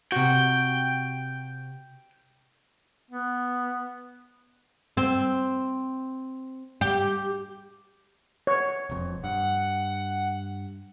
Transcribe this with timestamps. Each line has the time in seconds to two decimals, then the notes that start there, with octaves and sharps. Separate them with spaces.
0.12 C3 F#4 G5
3.11 B3
4.97 C4
6.81 G4
8.47 C#5
8.89 E1 F2
9.24 G2 F#5